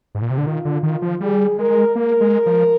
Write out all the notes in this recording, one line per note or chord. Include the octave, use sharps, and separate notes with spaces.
G#2
A#2
C3
D3
D#3 F4
D3
D#3 F4
F3
G3 G#4
G#3 A#4
A#3 A#4
G#3
F3